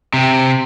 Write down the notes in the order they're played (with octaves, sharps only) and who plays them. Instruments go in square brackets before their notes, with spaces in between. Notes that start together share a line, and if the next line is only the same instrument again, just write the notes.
[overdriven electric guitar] C3